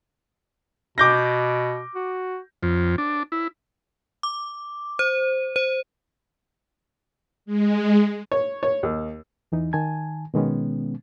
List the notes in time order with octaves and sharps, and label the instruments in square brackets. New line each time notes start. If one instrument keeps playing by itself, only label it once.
[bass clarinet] B2 [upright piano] D6 G6 A#6
[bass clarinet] F#4
[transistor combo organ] F2
D4
E4
[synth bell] D6
C5
C5
[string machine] G#3
[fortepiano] C#5
C#5
D#2
[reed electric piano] E2 E3 D#4
D#3 G#5 A5 G#6
B2 D#3 G#3 B3 C#4